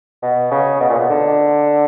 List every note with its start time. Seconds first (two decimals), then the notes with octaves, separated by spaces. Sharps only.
0.22 B2
0.51 C#3
0.80 B2
0.90 A#2
0.99 B2
1.10 D3